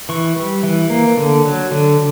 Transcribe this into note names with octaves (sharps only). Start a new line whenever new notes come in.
E3 C#6
G3
E3
A#3
D3
F#3
D3